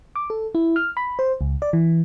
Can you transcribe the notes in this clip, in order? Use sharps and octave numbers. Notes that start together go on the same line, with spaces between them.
D6
A4
E4
F6
B5
C5
C#2
D5
E3